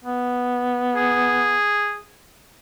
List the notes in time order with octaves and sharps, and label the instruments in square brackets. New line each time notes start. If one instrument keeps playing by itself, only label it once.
[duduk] B3
[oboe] G#4